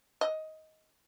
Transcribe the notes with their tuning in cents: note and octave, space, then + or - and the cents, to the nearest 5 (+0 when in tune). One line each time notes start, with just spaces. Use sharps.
D#5 +15